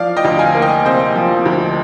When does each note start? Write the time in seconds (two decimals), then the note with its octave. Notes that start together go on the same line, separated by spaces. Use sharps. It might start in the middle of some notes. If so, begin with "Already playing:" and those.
Already playing: F3 D5 F5
0.17 D#5 G5
0.24 D2
0.39 F5 G#5
0.55 A#3
0.62 D#5 G5
0.85 C3 C5 D#5
1.16 F3
1.46 D2